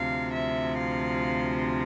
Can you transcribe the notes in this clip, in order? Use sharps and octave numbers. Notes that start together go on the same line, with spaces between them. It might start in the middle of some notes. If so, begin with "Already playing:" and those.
Already playing: D2 C3 F3 F5
E5
F5